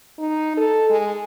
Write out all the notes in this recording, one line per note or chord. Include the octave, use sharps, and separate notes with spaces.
D#4
A4
G#3